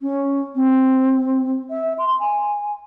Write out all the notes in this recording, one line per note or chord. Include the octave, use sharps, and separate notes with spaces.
C#4
C4
E5
C6
G#5